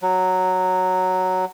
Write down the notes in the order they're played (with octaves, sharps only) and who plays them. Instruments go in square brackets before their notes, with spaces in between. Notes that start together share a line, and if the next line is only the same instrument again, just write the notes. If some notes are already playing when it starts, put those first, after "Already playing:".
[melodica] F#3